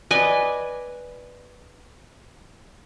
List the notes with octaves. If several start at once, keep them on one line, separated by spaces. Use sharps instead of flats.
B4 D5 D#5 G#5